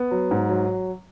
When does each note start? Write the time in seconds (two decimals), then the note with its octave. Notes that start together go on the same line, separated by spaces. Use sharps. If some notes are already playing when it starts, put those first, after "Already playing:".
Already playing: B3
0.11 F#3
0.31 G#2
0.49 F#3